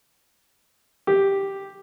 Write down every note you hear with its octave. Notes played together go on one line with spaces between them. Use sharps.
G4